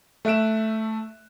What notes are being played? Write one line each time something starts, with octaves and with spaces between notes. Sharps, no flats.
A3 E5 F#6 D7 E7